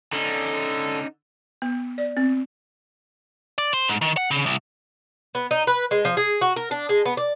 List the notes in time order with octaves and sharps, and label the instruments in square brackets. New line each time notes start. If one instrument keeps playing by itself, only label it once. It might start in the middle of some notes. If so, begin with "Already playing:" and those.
[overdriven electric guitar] D3 [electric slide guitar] C#4 D#4
[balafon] B3
D5
C4
[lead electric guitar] D5
C5
G#2
D#3
F#5
C#3
C2
[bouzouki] B3
D#4
B4
G#3
F3
G#4
F#4
A#4
D4
G#3
B3
D5